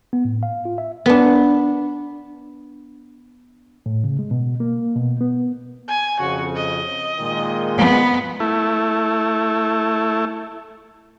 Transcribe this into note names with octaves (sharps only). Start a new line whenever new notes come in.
B3
A2
F5
F4
E5
B3 D4
A2
C#3
G#3
B2
A#3
B2
B3
G#5
F2 C#3 F#4
D#5
A#2 D#3 G#3
B3
A3 E4